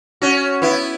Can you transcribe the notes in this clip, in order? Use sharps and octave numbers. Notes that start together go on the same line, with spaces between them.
C#4 F#4
B3 E4